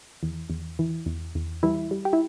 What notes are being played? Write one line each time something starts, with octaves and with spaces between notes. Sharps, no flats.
E2
E2
E3
E2
E2
E3 G3 E4
G3
G4
E4